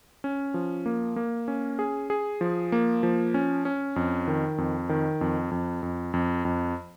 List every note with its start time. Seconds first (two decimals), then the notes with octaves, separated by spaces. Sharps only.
0.24 C#4
0.54 F3
0.86 A#3
1.16 A#3
1.48 C#4
1.79 G#4
2.10 G#4
2.41 F3
2.72 A#3
3.03 F3
3.34 C#4
3.65 C#4
3.96 F2
4.28 D#3
4.58 F2
4.89 D#3
5.21 F2
5.51 F2
5.83 F2
6.14 F2
6.45 F2